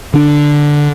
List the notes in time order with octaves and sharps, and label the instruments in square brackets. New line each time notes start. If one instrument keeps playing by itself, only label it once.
[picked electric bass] D3 D4